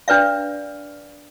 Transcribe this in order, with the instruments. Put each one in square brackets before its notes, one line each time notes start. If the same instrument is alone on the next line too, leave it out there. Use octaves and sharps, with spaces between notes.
[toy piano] D4 B4 D5 F5